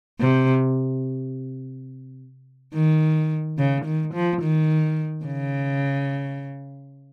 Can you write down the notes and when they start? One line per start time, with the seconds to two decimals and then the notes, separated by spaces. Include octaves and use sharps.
0.20 C3
2.74 D#3
3.58 C#3
3.85 D#3
4.14 F3
4.41 D#3
5.25 C#3